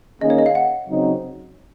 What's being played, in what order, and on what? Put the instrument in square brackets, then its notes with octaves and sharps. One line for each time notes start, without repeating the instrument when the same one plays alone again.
[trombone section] D#3 A#3 C#4 G#4 [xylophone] D#5
[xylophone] C#5
D#5
F5
F#5
[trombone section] C#3 F#3 C4 D#4